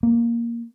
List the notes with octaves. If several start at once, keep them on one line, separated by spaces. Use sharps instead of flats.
A#3